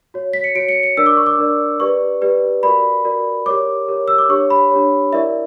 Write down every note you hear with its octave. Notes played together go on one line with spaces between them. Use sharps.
F#4 C#5
B6
C#7
F#4 C#5 D7
C#7
C#7
D4 A#4 D5 E6
D6
C#6
D6
D4 A#4 D5
G4 B4 D5 C#6
G4 B4 D5
F#4 A#4 D5 B5
F#4 A#4 D5
G4 A#4 C#5 D6
G4 A#4 C#5
E6
D6
D4 G4 C#5 C#6
B5
D4 G4 C#5
E4 A#4 D5 E5